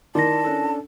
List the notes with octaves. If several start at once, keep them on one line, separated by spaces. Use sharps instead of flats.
D#3 E4 D5 A5 C6 A#6
C#4 D4 A4